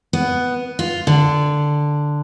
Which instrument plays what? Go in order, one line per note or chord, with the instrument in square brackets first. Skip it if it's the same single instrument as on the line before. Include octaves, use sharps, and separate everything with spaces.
[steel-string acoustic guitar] B3
F4
D3